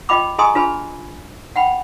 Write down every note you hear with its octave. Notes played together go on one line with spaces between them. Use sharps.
F4 D#5 G5 B5 D6
G#4 D#5 G#5 A#5 C6 D#6
D4 F4 G#4 B4 G#5 B5
F#5 G5 B5